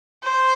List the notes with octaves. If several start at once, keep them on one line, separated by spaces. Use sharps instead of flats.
C5